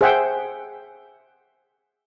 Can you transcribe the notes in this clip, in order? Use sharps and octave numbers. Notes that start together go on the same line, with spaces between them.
G#4 C5 E5 F#5 G5